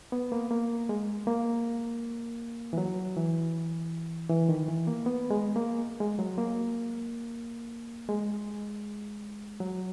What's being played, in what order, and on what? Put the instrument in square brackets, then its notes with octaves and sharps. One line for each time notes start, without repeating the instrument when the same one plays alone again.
[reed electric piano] B3
A#3
A#3
G#3
A#3
E3
F#3
E3
E3
D#3
E3
A#3
B3
G#3
A#3
G#3
F#3
A#3
G#3
F#3